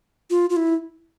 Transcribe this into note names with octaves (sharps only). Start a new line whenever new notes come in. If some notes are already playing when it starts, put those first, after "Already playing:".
F4
F4
E4